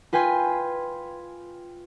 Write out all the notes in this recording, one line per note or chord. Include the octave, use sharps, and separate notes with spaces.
F4 B4 G5 G#5 C6